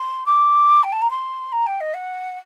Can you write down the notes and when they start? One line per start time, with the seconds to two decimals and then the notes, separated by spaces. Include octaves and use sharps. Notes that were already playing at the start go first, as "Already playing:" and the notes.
Already playing: C6
0.25 D6
0.83 G5
0.92 A5
1.01 A#5
1.10 C6
1.52 A#5
1.66 G5
1.80 D#5
1.93 F#5